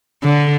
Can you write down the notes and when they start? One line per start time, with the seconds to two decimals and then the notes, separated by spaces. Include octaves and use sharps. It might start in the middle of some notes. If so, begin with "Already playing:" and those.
0.23 D3